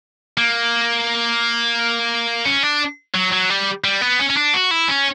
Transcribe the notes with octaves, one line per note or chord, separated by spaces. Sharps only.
A#3
C#4
D4
F#3
F#3
G3
G3
B3
C#4
C#4
D4
F#4
E4
C#4